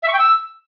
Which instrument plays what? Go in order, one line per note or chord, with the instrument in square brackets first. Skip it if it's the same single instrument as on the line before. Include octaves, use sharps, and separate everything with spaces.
[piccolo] E5
C#6
G5
E6